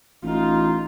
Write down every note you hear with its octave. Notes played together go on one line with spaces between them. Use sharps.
A1 D#4 F4